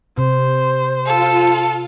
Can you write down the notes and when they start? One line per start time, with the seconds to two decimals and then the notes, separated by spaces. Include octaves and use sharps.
0.18 C3 C5
1.06 F4 A4 F5